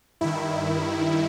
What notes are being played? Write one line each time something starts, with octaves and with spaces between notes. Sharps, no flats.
G2 D#3 E4